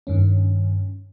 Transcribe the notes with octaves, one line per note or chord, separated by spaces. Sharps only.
G2 D#3 C#4